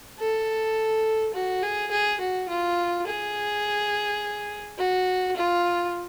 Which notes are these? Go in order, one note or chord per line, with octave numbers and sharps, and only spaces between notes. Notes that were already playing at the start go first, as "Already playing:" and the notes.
A4
F#4
G#4
G#4
F#4
F4
G#4
F#4
F4